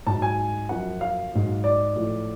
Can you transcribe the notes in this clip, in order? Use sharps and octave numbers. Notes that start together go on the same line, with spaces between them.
G#2 F#3 A5
G#5
F#2 F3 F#5
F5
G#2 F#3
D5
A2 F3